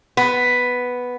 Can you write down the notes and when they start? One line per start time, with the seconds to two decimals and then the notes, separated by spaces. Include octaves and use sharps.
0.17 B3